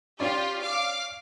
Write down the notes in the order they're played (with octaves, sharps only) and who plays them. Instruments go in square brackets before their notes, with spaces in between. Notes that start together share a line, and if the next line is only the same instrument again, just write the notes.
[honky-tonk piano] C#4 D5 [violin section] F4 G4
[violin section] F5 D6